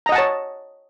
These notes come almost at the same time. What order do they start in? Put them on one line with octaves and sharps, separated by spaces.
A#5 D#5 F#5 A5 C#5